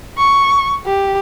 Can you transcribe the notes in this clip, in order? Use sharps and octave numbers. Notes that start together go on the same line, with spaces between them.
C#6
G4